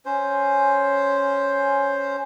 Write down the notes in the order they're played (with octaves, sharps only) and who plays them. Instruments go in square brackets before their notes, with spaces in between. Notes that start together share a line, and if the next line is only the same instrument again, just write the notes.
[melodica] C#4 C5